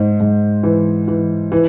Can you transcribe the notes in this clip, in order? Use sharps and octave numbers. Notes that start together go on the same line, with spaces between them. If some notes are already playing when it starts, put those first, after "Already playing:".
Already playing: G#2 C5
G#2
E3
E3
E3